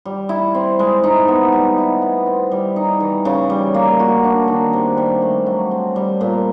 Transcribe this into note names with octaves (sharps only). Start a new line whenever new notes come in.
G3
E4
C4
G#3
D#4
B3
G3
E4
B3
C4
G3
D#4
E3
C#3
G3
A#3
F#4
D4
D#3
C3
G3
A3
F#3
C4
G3
A#2